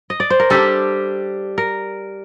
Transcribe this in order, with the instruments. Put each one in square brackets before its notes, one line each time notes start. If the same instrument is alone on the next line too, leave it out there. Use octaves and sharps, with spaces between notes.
[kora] D#5
D5
C5
A#4
[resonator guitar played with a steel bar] G3 D4 G4 [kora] A4
[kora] A#4